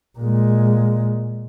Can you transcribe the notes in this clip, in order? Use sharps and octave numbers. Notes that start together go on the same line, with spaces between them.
A#2 G#3